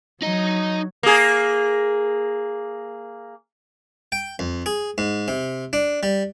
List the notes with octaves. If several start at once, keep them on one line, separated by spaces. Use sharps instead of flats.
F#3 D#4 D#5
A#3 G#4
G5
F2
G#4
G#2
C3
D4
G3